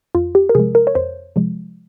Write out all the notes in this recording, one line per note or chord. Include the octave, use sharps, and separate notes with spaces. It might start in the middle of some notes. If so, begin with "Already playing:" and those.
F2 F4
G4
A#4
C3 F3 G#3 G#4
A#4
C#5
F2 C5
C3 F3 G#3